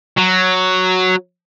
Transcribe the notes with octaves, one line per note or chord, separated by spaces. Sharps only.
F#3